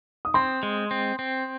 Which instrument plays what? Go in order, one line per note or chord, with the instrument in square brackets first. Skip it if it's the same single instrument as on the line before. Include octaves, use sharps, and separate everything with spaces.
[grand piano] D#6
[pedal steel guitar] C4 [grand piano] C6
[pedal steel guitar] G#3
C4
C4